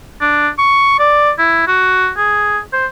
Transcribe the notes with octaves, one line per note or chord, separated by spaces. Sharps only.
D4
C#6
D5
E4
F#4
G#4
C5